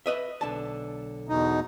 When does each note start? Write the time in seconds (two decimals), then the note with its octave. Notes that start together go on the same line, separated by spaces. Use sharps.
0.06 B4 D#5 E5
0.41 B1 D3 A5
1.29 E2 B2 D#4